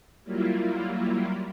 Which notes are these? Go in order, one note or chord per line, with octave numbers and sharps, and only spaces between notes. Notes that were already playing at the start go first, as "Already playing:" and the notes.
F#3 G3 A#3 E4 F4